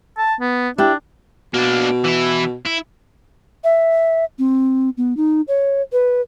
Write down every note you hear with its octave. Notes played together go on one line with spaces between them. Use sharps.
A5
B3
D4 E4 G4
B2 A#3 D4
E3 E4
E4
E5
C4
B3
D#4
C#5
B4